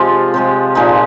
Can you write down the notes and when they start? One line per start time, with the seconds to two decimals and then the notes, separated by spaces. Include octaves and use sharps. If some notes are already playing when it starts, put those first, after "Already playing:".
Already playing: C3 F3 G#3 F4
0.34 C3 F3 G#3
0.75 A#2 F3 G#3 D#4 G#4